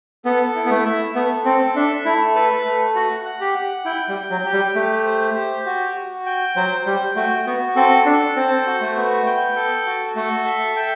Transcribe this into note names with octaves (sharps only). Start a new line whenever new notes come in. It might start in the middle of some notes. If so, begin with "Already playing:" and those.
B3 A4
E4
B3
A3
E5
A3 B3
C4 A4
D4 E5
A3 E4
A4 B4
A3
F#4 F#5
F#5
G4
F#5
E4 G5
G3
G5
F#3
G4
G3
A3 G4
C5
G4
F#4
F#4
G5
F#3 C5
G3 G5
A3 F#4
B3 F#4
C4 A4
D4 A4
C4 C5
F#4
A3
B3
G5
A4
F#4
A3 A4
E5
G5